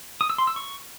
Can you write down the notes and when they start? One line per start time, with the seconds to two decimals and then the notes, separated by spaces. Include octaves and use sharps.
0.21 D#6
0.30 E6
0.38 C6
0.47 E6
0.56 C#6